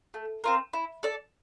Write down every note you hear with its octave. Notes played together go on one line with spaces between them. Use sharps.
A3
C4 F4 A#4
E4
A4 D5